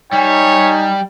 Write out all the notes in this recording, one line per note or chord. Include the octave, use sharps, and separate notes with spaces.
G3 D#4 C#5 G#5